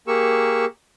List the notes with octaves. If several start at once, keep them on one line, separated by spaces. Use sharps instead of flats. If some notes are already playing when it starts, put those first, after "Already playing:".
A#3 G4 G#4 A#4 C#6 E6